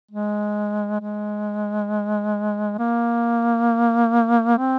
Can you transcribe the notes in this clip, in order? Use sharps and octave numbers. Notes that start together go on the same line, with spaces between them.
G#3
G#3
A#3
C4